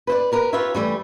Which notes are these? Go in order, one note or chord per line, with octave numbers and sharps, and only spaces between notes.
B4 C5 D5
G4 A#4 B4
F4 G4 B4 C#5 E5
E3 G3 A3